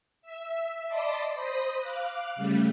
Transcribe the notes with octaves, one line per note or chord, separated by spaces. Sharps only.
E5
D5 D#5 A5 B5 C6 D6
C5 B5 D#6 A#6
F5 D6 F#6
C#3 G3 A3